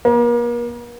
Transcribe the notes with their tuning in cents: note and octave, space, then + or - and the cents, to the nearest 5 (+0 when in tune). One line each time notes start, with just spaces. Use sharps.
A#3 +40